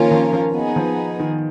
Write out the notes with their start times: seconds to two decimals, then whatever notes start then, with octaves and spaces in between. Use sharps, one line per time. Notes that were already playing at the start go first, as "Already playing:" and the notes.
Already playing: D#3 F3 A#3 C#4 F4 A#4
0.11 F3
0.33 F3
0.55 B3 D#4 G#4
0.76 F3
1.20 D#3